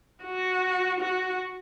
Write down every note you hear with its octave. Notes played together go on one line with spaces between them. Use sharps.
F#4
F#4